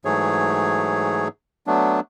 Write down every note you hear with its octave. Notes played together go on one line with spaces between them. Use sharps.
G#2 E3 F#3 A3 G#4 C#5
F#3 A3 B3 D4